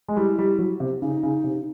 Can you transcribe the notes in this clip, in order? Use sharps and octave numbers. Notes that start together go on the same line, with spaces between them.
G#3
G3 E4
G3
F#3
C3
C#3 D#4
C#3
C3